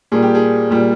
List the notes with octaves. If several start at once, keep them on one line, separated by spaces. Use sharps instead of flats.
A#2 G3 G#4
G4
G#4
A#2 G3